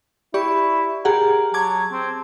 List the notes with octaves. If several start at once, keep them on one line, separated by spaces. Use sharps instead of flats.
E4 G4 D5 C#6
G4 G#4 A#4 F#5
F#3 A5 D6 G#6
C4